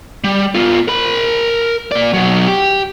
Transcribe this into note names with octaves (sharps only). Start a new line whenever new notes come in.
G3
B3 F4
A#4 B5
A#3 D5
B2 F#3
G4